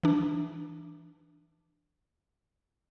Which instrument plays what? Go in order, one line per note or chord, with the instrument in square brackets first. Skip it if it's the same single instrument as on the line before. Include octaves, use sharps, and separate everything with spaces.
[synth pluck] E3 D4